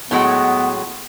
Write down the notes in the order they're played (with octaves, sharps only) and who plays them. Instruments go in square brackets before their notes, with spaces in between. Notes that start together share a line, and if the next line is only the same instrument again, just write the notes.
[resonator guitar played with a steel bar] A2 F#3 G#3 [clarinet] B3